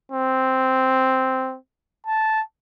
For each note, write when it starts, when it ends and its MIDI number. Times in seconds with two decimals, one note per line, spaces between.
0.12 1.57 60
2.07 2.42 81